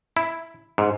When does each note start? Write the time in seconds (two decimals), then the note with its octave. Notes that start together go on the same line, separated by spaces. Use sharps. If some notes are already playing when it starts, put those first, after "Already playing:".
0.17 E4
0.78 G#2